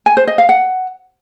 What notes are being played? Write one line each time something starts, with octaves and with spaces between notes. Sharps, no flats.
G#5
C5
D#5
F5
F#5